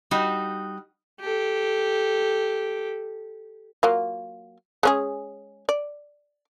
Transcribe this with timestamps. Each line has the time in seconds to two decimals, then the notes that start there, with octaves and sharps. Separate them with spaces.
0.11 G3 D#4 F#4
1.20 G4 A4
3.83 F#3 A#3 F4
4.83 G#3 C#4 G#4
5.69 D5